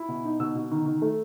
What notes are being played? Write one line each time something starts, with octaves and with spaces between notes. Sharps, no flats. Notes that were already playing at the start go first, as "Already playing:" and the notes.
Already playing: E4
B2
D#4
B2 E6
B2
D#3
D#3
A3